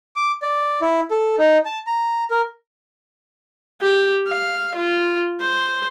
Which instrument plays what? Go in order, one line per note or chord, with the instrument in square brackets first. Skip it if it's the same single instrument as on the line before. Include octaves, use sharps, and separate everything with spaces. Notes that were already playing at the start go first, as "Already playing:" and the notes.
[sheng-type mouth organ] D6
D5
E4
A4
D#4
A5
A#5
A#4
[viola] G4
F5
F4
C5